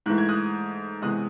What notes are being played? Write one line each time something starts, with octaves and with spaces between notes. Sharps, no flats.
G#2 E3 A3 F#6
G#6
D#6 F#6
E2 C3 E3 G#3 D#6 F#6